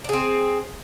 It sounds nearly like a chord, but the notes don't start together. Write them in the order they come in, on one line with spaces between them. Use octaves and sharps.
D4 G#4 C4